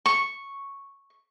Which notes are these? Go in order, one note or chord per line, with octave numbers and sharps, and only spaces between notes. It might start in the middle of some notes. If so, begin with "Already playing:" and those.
C#6